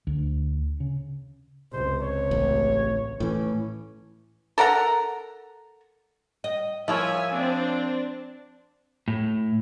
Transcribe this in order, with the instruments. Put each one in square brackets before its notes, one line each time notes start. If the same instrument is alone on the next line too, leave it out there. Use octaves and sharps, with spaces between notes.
[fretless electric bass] D2
C#3
[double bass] C#2 C3 [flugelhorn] C5
[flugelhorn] C#5
[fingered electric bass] A1
[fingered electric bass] A2 E3 [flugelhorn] C#4
[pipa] A4 A#4 F#5 A#5
[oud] D#5
[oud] F3 [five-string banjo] E4 A#4 C#5 [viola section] E5 G#5
[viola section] C4 D4
[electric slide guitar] A2